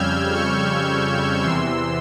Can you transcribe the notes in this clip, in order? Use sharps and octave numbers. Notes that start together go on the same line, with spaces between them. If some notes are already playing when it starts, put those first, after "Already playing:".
Already playing: F2 C#3 G3 E6 F6 G6 G#6
C#6 F6
E2 C3 E3 C6 E6